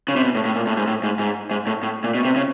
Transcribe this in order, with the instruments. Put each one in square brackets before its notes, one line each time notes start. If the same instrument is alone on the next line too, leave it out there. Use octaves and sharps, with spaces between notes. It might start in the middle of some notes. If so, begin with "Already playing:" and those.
[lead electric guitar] C#3
C3
B2
A2
A2
A#2
A2
G#2
A2
G#2
G#2
G#2
A2
A2
A#2
B2
C3
C#3